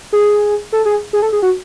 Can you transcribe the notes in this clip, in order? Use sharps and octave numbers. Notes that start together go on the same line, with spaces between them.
G#4
A4
G#4
G#4
A4
G#4
F#4